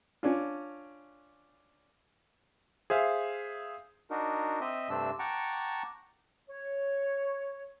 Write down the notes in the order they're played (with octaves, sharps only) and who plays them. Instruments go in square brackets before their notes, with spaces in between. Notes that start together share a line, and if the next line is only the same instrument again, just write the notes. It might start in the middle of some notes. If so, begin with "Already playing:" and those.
[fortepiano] C#4 D4 F4
[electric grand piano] G#4 C5 E5 F5
[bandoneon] D4 D#4 F#4 A#4
C4 D#5 E5
G2 C3 A3 C4 D4 E6
F#5 G5 A5 A#5 C#6 D6
[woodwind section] C#5